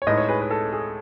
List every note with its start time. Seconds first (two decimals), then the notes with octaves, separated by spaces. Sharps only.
0.02 C#5
0.07 A2 G#3 D#4 B4 D#5
0.18 C#5
0.29 G#4 B4
0.41 B4
0.51 A4
0.73 G#4